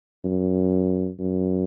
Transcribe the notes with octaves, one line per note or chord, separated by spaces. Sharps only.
F#2
F#2